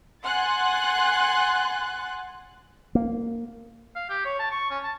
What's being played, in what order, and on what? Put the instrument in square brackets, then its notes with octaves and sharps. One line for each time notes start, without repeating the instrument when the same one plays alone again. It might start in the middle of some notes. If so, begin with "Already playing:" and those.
[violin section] F#5 G#5 C6 F#6 A6
[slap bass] A#3
[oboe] F5
G4
C#5
A5
C#6
C#4
A5